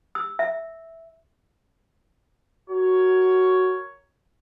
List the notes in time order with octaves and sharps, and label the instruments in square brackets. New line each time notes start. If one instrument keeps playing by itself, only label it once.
[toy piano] E6
E5
[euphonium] F#4 [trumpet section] A#4 C#5